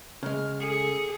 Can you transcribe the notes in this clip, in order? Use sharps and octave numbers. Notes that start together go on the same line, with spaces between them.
C#3 G#3 F6
G#4 A4 C#7